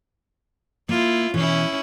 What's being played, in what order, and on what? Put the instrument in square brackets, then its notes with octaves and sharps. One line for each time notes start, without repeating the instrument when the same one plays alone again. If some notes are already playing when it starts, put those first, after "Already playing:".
[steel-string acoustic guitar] A#3 [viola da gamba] E4 F4
[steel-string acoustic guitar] B2 E3 [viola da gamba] C#4 E4